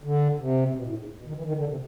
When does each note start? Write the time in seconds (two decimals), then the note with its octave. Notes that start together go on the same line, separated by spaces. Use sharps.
0.03 D3
0.39 C3
0.68 C3
0.75 B2
0.86 A2
0.98 G#2
1.18 B2
1.27 D#3
1.37 E3
1.45 D#3
1.57 D3
1.69 C3